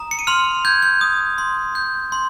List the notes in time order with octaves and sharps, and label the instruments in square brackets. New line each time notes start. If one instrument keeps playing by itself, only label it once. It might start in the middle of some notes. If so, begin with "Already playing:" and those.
Already playing: [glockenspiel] A#5 D#6
C#7
D#7
C6 F6 F7
G6 G#6
G6
D#6
C6
G6
C6